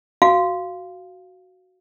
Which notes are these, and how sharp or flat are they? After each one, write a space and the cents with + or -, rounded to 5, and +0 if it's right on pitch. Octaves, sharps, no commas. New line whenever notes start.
F#4 +0 F5 -10